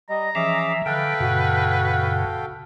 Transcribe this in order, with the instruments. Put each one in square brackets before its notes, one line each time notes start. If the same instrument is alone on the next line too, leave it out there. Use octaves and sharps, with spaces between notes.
[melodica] G3 [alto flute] D#5 [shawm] A#5
[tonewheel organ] E3 F3 [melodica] C#4 G#4 D6 [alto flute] E5
[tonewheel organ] D3 [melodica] A4 F5 G5 [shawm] B4
[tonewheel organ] F#2 A#2 C#3 [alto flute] F#4